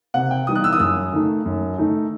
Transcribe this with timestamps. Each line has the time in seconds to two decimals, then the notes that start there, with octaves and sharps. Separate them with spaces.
0.14 C3 F#5
0.31 G5
0.47 E3 G3 B3 D#4 D#6
0.55 F#6
0.64 E6
0.72 D#6
0.79 F#2 E6
1.13 D#3 A3 D#4
1.46 F#2
1.78 D#3 A3 D#4